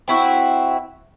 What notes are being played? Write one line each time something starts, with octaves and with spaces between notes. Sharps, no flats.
C4 E4 F#4